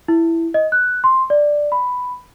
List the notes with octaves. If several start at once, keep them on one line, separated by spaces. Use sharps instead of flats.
E4
D#5
F#6
C6
D5
B5